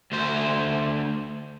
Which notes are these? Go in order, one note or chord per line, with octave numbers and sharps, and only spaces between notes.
D2 C5